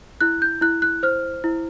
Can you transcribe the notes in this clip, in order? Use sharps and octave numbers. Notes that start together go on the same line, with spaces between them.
E4 F#6
G6
E4 F#6
F#6
C5 F6
E4